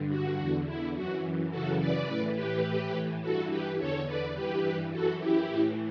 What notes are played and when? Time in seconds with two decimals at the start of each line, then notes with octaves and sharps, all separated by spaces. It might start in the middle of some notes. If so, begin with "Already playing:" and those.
Already playing: G2 D3
0.09 F#4
0.38 E2 D3
0.66 E4
0.94 F#2 E3 F#4
1.51 F#2 C#3 E3 F#4 A4
1.79 B4 D5
2.08 A2 E3
2.36 G4 B4
2.65 A2 E3
3.22 G2 E3 F#4 A4
3.49 G4 B4
3.78 E2 D3 A4 C#5
4.06 B4 D5
4.35 G2 E3 G4 B4
4.92 F#2 E3 F#4 A4
5.20 E4 G4
5.48 A2 E3